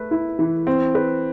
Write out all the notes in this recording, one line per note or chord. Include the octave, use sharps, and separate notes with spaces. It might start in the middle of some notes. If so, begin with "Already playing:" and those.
Already playing: A3 B4
E4
E3
C4
B4